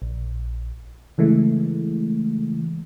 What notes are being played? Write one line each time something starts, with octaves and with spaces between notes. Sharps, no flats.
A#1
C#3 E3 G#3 A3